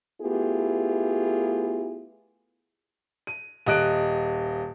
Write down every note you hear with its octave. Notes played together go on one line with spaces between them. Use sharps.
A3 B3 E4 F4 G4 G#4
D#7
D#1 D#5 F#6 D7